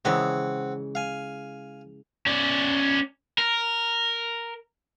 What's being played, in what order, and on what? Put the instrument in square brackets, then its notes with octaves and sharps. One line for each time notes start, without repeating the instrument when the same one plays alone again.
[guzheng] C#3 E3 G#3 [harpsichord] C4 F#5
[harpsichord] F5 G#5
[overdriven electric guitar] C#4 D5
A#4